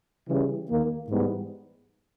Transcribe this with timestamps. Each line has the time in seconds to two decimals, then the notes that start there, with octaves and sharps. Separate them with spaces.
0.28 C#3 E3 G3 C#4 G#4
0.69 D#2 D#3 A#3
1.10 G#2 E3 G3 B3 D#4